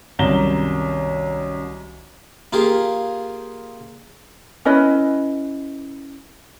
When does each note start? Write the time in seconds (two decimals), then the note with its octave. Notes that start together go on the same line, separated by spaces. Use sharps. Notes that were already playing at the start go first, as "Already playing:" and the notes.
0.19 C2 F#2 D#3 A#6 E7 G7
2.53 A#3 F4 G4 G#4
4.65 C#4 E4 B4 D#5